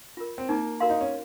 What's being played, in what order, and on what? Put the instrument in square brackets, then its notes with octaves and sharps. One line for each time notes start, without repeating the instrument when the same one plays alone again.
[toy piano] F4 A#4
[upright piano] C4
[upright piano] A#3 [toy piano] D#4
[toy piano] F#4 A#4 F5 C6
[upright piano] D#4
C#4